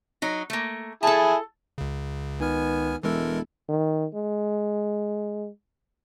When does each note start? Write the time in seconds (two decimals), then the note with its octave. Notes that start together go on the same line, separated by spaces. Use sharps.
0.22 F#3 D#4
0.50 A3 A#3
1.03 E4 G#4 A4 A5
1.78 C#2 C#3
2.40 C#2 D#3 B3 G#5 F6
3.03 E1 E3 G#3 E4 A4 A#4
3.69 D#3
4.14 G#3